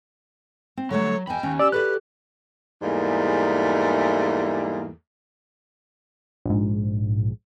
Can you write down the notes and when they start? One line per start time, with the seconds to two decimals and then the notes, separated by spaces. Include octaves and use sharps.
0.77 C4
0.91 D3 F#3 G3 A3 C#5
1.27 E2 D#5 G5 G#5 B5
1.43 D#2 C#4
1.59 G4 D5 E6
1.72 F#4 A4 B4 D5 F#6
2.82 E2 G#2 G3 A3 A#3
6.46 A#1 G#2